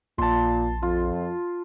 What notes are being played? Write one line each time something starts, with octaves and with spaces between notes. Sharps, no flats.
A#1 A#2 A5 C6
F2 F4